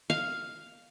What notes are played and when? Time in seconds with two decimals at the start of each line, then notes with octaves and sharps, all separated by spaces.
0.10 F5